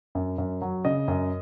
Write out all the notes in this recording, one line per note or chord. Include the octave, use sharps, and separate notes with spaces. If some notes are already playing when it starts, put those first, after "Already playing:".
F#2
F#2
F#3
C#3 D#5
F#2